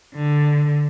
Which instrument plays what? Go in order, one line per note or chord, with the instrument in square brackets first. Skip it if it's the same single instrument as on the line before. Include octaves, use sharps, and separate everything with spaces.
[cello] D3